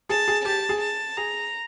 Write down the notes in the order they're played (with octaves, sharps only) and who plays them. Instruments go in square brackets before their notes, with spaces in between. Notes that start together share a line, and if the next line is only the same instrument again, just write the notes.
[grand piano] G#4 [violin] A5
[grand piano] G#4
[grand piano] G4 [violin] A5
[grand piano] G#4
[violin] A5
[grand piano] G#4 [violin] A#5